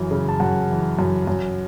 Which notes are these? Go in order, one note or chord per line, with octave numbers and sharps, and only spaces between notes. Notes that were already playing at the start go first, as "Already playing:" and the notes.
Already playing: F#2 E3
C#3
A5
F#2 F#5
E3
F#2
F#2